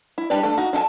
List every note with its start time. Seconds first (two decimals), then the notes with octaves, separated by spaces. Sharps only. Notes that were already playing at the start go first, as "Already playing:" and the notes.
0.18 E4
0.30 G3 D4 G4 B4 D5
0.43 A3 D4 A4
0.58 D#4 F#4
0.73 D4 A4 D#5 G#5 A5